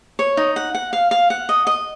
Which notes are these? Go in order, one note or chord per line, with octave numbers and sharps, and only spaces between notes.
C#5
D#4
F#5
F#5
F5
F5
F#5
D#5
D#5